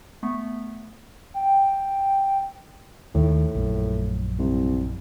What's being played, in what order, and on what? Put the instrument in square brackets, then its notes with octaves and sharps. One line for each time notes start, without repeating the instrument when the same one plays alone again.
[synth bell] A3 B3
[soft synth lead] G5
[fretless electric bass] D#2 D#3 [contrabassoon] A2
[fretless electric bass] A#1 F#2
[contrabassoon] C2